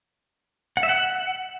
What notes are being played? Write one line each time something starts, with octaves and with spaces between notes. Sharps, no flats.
F#5
E5
F#5